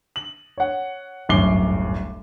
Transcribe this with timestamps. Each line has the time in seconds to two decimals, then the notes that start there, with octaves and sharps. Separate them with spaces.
0.16 F#7
0.58 C#5 F#5
1.29 D1 G1 F#2 D6 C7 G7